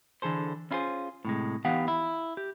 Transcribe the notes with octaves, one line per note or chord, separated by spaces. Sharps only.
D3 E3 G#4 A4 C5
C#4 E4 F4 G#4 C5
A2 C3 G#3
E3 B3 D#4 G4 F5 F#5
E4
G4